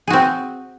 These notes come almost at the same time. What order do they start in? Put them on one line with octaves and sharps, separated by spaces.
G#4 F#4 C4